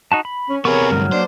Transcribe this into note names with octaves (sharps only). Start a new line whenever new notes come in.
D#4 F#4 A5
B5
C#4
C3 B3 G#4 A#4 C#5 B5 C#6
D2 G2 F#3 F6
A#3 D4 C5